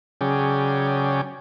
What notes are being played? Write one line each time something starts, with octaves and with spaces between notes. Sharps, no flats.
C#3 F#3 C#4 G#4 D5 G5